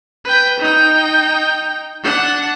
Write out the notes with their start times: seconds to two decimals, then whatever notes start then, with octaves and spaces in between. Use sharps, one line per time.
0.25 B4 G5
0.60 D#4 G5
2.03 D4 F#5